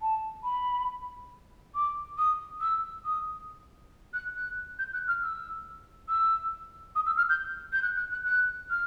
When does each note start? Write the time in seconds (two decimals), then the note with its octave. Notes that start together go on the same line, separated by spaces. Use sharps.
0.02 A5
0.44 B5
1.75 D6
2.18 D#6
2.61 E6
3.05 D#6
4.14 F#6
4.36 F#6
4.79 G6
4.93 F#6
5.08 F6
5.23 E6
6.09 E6
6.96 D#6
7.06 E6
7.17 F6
7.29 G6
7.73 G6
7.82 F#6
7.97 F#6
8.12 F#6
8.26 F#6
8.70 F6